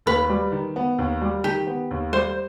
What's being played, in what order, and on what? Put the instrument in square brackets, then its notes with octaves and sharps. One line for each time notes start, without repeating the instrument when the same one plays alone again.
[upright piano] D#2 [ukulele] B4
[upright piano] G3
D#3
B3
D#2
G3
[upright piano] D#3 [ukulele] G4
[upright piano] B3
D#2
[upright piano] G3 [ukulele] C5